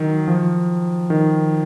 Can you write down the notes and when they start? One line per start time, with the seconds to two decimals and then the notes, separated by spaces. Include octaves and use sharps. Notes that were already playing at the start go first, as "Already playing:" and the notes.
Already playing: D#3 F#3
0.28 F3
1.10 D#3